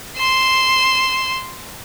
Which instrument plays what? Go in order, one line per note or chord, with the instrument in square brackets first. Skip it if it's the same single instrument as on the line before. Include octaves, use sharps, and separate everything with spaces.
[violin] C6 E7